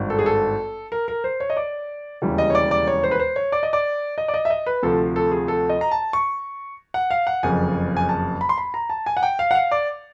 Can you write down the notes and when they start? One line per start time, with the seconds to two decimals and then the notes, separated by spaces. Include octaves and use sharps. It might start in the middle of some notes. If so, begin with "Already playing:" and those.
Already playing: G#1 G2 D#3
0.10 A4
0.19 G#4
0.26 A4
0.92 A#4
1.08 A#4
1.24 C5
1.40 C#5
1.50 D#5
1.57 D5
2.22 E1 D#2 C#3 E3 G3
2.38 D#5
2.50 C#5
2.55 D5
2.71 D5
2.87 C#5
3.04 C5
3.11 B4
3.20 C5
3.36 C#5
3.52 D5
3.63 D#5
3.73 D5
4.18 D#5
4.28 D5
4.34 D#5
4.45 E5
4.50 D#5
4.66 B4
4.83 D2 C3 F3 A4
5.16 A4
5.31 G#4
5.48 A4
5.69 D#5
5.81 A#5
5.91 A5
6.13 C#6
6.94 F#5
7.11 F5
7.27 F#5
7.43 F#1 F2 C#3 G#5
7.97 G#5
8.09 A5
8.41 B5
8.49 C6
8.58 B5
8.74 A#5
8.90 A5
9.06 G#5
9.17 F#5
9.23 G5
9.39 F5
9.51 F#5
9.55 F5
9.71 D5